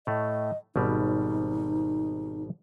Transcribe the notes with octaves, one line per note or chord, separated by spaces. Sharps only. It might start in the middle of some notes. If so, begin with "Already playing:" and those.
A2 A3 D#5
G#1 B2 G3 D#4